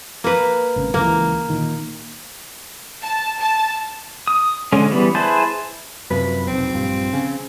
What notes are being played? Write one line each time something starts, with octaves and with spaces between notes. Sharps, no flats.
A#3 B4
G#1 C#3
C#2 E3 A#3
A#2 D#3
A5
A5
D#6
D3 G#3 C#4
E3 G3 B3
E4 G#4 B4 C5 A5
F#2 C3 F3 B4
F1 B1 C4
A#1 G2 F3
C#3